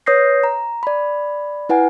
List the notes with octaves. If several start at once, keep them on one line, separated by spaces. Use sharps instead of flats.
B4 C#5 D#6 G6 A#6 C7
A#5
D5 B5
E4 B4 F#5 G#5